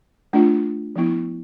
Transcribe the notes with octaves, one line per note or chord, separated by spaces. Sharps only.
A3 D4 F4
F3 B3 E4